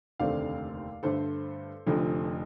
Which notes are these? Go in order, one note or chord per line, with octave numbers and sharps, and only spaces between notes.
F1 D#2 D3 A3 C4 D5 F5
G2 D3 A3 A4 C5
F1 F2 D3 F3